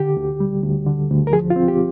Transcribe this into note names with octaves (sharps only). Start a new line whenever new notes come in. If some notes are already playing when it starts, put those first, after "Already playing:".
Already playing: D3 G4
D2
G3
D2
D3
D2
A#4
F3 G#4
F4
C4
G4